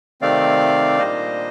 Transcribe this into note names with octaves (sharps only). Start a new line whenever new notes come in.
C3 D#3 A3 C4 D5 F5
A#2 G3 A#3 D4 C5 D#5